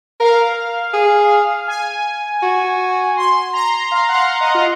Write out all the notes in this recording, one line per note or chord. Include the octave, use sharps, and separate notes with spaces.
A#4 F5
G#4
G#5
F#4
C6
A#5
F5
F#5
F5
D#5
F4